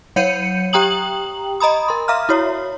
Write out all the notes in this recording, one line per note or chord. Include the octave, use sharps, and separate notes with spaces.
F#3 C#5 F#5 G6 C#7 D#7
G4 G5 A#5 D#6 F#7
D#5 A#5 B5 D#6
A#4 C6
E5 F5 A#5 F6
E4 F#4 C#5